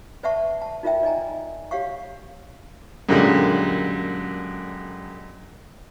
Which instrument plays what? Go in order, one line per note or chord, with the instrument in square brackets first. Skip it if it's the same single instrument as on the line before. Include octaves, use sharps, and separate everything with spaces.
[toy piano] B4 D5 E5 F#5 A5 C#6
A5
D#4 F4 A#4 D5 E5 G5
D5 D#5 G#5 A#5
G4 C#5 F5 F#5 C#6
[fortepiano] F#2 A#2 D3 G3 G#3